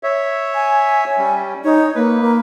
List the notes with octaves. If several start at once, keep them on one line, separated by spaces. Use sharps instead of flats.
C#5 E5
G#5
G3 C#4
D#4 C#5
A#3 B4
A#3